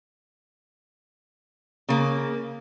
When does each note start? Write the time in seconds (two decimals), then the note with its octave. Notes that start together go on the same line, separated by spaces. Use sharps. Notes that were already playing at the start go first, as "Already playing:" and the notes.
1.89 C#3 A#3